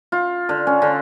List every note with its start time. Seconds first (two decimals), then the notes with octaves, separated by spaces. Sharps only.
0.12 F4
0.49 D3
0.67 C#4
0.82 D3